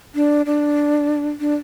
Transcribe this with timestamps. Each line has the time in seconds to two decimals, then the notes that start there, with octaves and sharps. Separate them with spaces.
0.15 D4
0.46 D4
1.40 D4